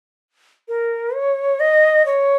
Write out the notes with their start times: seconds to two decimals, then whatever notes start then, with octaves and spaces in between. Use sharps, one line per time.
0.69 A#4
1.14 C#5
1.60 D#5
2.06 C#5